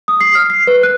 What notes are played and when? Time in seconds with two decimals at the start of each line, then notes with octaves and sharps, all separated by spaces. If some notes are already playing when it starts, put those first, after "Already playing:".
0.08 D#6
0.21 C7
0.35 F6
0.50 C7
0.67 B4
0.83 F#6